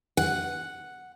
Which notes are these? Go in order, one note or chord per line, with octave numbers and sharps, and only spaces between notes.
F#5